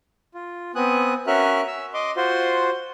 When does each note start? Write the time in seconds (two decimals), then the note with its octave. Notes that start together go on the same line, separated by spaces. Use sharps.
0.34 F4
0.75 B3 C4 G#5 D#6 F#6
1.27 C#4 F#4 A#4 E5 F6 F#6
1.67 E6
1.94 D#5 C6 D6
2.17 F4 F#4 C5 C6